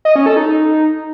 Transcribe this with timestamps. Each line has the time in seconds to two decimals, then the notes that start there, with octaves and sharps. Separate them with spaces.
0.05 D#5
0.16 C#4
0.26 A4
0.37 D#4